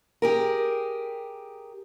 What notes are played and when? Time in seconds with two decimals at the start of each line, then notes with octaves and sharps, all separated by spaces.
0.22 G4 G#4 A#4